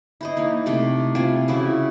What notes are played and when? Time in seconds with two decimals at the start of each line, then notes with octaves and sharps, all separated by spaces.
0.21 E4 C5 D#5
0.37 E3 A#3 D#4
0.66 C3 A3 C4
1.15 C4 E4 F4 G#5
1.48 C#3 E3 E4 F#4